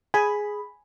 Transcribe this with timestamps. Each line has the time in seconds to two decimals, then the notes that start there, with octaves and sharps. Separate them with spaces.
0.14 G#4 G#5 B5